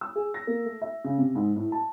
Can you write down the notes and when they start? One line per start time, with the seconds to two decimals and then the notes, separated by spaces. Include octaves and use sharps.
0.01 E6
0.16 G#4
0.34 A#6
0.47 A#3
0.65 A3
0.82 E5
1.04 C#3
1.18 C3
1.35 G#2
1.56 A2
1.72 A5